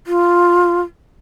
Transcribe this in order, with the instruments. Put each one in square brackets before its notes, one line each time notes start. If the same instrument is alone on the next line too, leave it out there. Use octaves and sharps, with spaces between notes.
[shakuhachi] F4